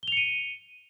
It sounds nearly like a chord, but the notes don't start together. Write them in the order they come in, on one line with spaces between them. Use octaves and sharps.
G7 F7 C#7 D#7